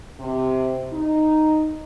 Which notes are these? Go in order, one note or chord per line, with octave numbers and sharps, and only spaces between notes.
C3
D#4